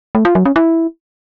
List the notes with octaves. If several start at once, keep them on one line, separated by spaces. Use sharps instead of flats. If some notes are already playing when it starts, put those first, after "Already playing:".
A3
F4
F#3
C#4
E4